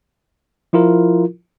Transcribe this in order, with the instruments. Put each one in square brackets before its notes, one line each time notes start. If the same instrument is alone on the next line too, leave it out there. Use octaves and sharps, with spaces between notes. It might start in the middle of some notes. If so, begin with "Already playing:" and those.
[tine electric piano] F3 E4 F4 A#4